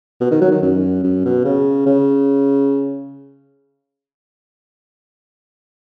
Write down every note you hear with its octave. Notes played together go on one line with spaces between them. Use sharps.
B2
D#3
F#3
D#3
F#2
F#2
B2
C#3
C#3